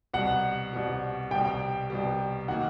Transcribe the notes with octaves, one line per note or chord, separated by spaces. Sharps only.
C2 B2 G3 F#5
C2 B2 G3
C2 B2 G3 G5
C2 B2 G3
D#3 F#3 A#3 F#5